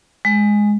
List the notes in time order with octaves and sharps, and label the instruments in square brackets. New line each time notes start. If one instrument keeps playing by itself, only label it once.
[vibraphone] G#3